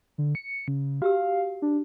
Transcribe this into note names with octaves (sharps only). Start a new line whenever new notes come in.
D3
C#7
C#3
F#4 G4 F5 E6
D4